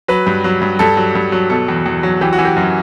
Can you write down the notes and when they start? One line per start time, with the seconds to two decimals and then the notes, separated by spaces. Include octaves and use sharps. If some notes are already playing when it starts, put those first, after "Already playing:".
0.08 F#3 B4
0.27 G2
0.44 F#3
0.62 G2
0.79 G2 A4
0.97 F#3
1.15 G2
1.32 F#3
1.50 B2 A4
1.68 E2
1.86 E2
2.03 F#3
2.21 E3 G4
2.33 F#4
2.38 E3
2.45 G4
2.56 F#2